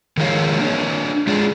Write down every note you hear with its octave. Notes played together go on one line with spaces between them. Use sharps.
D#3 F3 G#3 A#4 C#5 F5
A#3 D4 C#5
G#3 F4 G#4 D5